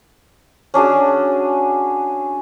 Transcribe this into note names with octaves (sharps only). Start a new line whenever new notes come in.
C#4 D4 F#4 G#4